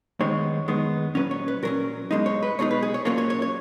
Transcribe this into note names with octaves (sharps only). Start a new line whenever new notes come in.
F#2 D#3 G#3 B3 D#4 C#5
F#2 D#3 G#3 B3 D#4
A#2 F#3 C#4 B4
C#5
B4
A#2 F#3 C#4 A#4
B1 B2 G#3 D#4
C#5
B4
B1 B2 G#3 D#4 C#5
B4
G#4
C#5
B1 A#2 F#3 A#3 C#4 C#5
C#5
C#5
C#5